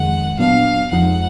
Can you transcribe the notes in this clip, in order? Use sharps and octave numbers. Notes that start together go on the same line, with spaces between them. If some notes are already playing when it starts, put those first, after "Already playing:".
Already playing: F2 D#3 G#3 F#5
A#2 F#3 B3 D4 F5
F2 F3 G#3 D#4 F#5